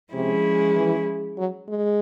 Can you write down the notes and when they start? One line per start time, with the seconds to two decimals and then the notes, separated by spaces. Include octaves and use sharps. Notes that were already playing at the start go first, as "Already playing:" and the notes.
0.13 C3 F3 G#3 C#4 E4
0.76 E3
1.38 F#3
1.68 G#3